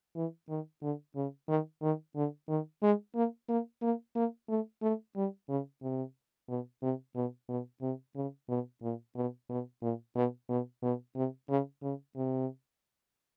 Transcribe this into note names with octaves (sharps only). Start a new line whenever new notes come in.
E3
D#3
D3
C#3
D#3
D#3
D3
D#3
G#3
A#3
A#3
A#3
A#3
A3
A3
G3
C#3
C3
B2
C3
B2
B2
C3
C#3
B2
A#2
B2
B2
A#2
B2
B2
B2
C3
C#3
C#3
C3